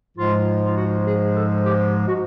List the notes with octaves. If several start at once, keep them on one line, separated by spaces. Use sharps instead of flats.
G#2 F3 G#3 F4
F4
F#4
G#4
A4
G4
F#4